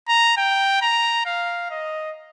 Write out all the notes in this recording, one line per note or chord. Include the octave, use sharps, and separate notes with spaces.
A#5
G5
A#5
F5
D#5